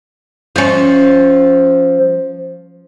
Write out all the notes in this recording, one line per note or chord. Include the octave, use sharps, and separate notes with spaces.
F3 C#4